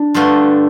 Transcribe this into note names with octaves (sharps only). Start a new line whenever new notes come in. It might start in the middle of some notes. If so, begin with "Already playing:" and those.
Already playing: D4
G2 D3 A3 F4